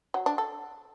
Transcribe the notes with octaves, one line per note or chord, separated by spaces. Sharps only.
F#3
D4
A4